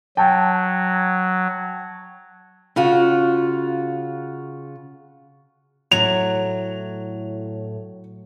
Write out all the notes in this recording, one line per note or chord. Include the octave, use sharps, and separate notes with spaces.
F#3 G5 A5
C#3 F4 F#4
A2 F#3 F7